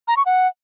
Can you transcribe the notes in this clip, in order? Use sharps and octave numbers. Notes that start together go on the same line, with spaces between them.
A#5
C#6
F#5